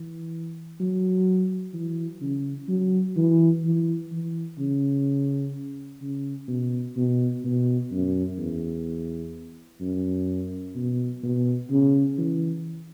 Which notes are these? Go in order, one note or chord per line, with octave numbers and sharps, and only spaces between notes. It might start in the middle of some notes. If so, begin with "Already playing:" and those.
Already playing: E3
F#3
E3
C#3
F#3
E3
E3
E3
C#3
C#3
B2
B2
B2
F#2
E2
F#2
B2
B2
C#3
E3